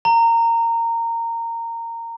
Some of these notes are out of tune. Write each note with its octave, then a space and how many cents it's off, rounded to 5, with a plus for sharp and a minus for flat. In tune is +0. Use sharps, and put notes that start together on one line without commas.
A#5 -20